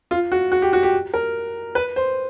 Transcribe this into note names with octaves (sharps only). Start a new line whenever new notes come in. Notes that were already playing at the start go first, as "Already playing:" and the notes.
F4
F#4
F#4
G4
F#4
G4
A#4
B4
C5